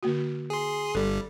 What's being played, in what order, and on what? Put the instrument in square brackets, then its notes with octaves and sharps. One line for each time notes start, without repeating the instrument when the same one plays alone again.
[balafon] D3 A#3 F#4
[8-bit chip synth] G#4 C6
[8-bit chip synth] G1 G3 [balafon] A4